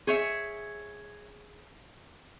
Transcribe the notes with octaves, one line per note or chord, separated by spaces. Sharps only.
G#4 C#5 E5